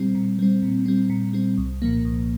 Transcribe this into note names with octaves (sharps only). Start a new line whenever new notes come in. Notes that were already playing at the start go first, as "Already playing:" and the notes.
Already playing: A#2 G3 C4
A#2
G3 C4
A#2
G3 C4
A#2
G3 C4
C2
A#2 F3 A#3
C2